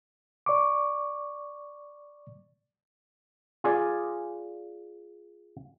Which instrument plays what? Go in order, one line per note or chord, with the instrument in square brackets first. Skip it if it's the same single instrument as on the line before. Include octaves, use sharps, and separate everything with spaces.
[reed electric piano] D5 C#6 D6
[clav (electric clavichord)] F4 G#4 D5